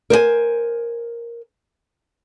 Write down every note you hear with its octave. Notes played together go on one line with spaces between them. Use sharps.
A#4 C5 D5 G#5